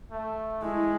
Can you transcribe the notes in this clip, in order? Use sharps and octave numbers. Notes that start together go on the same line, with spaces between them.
A3
G#3 E4